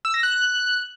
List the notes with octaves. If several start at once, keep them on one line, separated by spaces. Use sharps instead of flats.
E6
A#6
F#6